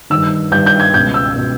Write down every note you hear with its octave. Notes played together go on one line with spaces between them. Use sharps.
G2 D#3 E6
G2 D#3 G6
G6
G#6
C#2 B2 G6
E6
B2